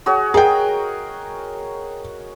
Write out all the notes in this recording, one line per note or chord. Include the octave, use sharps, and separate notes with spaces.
F#4 G#4 C#5
G#4 A#4 D#5 G5